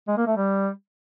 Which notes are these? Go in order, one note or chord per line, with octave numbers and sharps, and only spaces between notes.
G#3
A#3
A3
G3